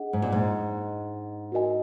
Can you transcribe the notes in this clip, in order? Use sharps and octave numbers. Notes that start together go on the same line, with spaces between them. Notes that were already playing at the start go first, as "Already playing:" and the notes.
Already playing: D4 G#4 D#5 F#5
G#2
A#2
G#2
F#4 A#4 D#5 G#5